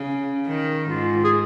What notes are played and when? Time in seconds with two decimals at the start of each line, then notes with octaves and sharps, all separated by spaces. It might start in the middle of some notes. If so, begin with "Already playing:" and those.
Already playing: C#3
0.47 D#3
0.89 G#2 F4
1.24 G#4